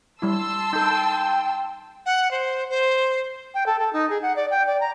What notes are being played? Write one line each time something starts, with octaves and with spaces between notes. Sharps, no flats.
G3 E4 A5 C6 E6
D#4 A4 G5
F#5
C5
C5
G5
A4
A4
D#4
G#4
F#5
D5
G5
D5
A#5